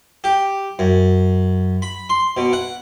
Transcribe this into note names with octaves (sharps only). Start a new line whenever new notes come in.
G4
F#2
B5
C6
B2
F#5